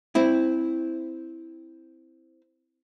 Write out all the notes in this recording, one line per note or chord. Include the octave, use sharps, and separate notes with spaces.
C4 E4